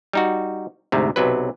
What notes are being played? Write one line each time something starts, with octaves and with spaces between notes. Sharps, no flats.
G3 D#4 F#4
D2 G#2 C3
B1 C3 F#3 B4